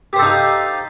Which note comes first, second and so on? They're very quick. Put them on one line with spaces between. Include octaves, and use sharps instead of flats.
G4 C5 A4 D#4 F5